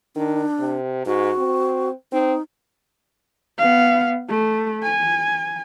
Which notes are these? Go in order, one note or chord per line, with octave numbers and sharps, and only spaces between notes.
D#3 D4
C3
G#2 F#4
C4
C4 D#4
B3 F5
A3
G#5